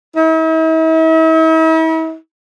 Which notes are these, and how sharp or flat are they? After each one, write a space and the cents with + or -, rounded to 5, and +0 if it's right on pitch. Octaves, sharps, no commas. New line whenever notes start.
E4 -45